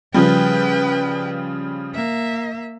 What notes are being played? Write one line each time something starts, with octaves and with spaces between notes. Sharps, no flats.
C#3 F3 G3 B4 G5
A#3 E5